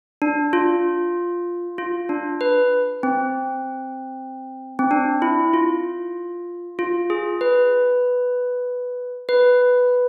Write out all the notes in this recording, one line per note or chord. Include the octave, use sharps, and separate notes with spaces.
D4
F4
F4
D4
B4
C4
C4
D4
E4
F4
F4
G#4
B4
B4